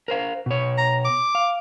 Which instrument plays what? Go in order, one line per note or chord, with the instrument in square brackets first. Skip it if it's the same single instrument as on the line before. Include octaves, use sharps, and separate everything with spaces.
[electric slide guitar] A#4 C5 F5
B2 C#5
[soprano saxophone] A#5
D6
[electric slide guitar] F5